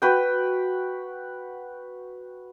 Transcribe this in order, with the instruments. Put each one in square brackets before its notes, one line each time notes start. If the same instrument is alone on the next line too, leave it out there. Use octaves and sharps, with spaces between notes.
[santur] F#4 B4 G5